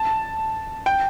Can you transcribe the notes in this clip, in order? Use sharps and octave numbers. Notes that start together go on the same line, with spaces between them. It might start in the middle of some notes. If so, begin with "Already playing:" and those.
Already playing: A5
G5